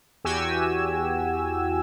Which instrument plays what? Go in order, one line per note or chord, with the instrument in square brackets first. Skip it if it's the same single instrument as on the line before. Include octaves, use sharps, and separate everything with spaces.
[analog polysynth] E2 F#4 G4 G#5 E6